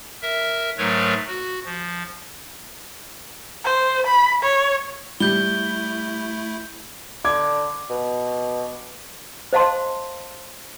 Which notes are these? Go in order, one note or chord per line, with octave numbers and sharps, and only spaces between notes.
A#4 E5
G#2 F#3 A3 A#4 B4 C#5
F#4
F3
C5
B5
C#5
G3 A3 E4 G6 G7
D3 D6 G#6
B2
C5 D#5 F5 A5 C6